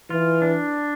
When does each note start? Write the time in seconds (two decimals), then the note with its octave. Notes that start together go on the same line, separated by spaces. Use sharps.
0.10 E3 F4
0.42 D4